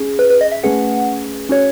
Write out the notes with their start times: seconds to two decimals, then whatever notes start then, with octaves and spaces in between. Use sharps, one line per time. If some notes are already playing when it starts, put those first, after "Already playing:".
Already playing: C#4 G#4
0.19 B4
0.30 B4
0.41 D#5
0.52 E5
0.63 A3 C#4 G#4 B4 F#5
1.49 C#4 F#4 C#5